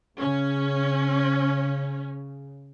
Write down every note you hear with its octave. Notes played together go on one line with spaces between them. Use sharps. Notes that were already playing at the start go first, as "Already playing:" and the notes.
C#3 C#4